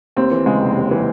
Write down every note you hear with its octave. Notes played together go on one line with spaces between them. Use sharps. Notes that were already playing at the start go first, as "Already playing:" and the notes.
D#2 C4
E3
C#3 G#3
F1
D#2
E3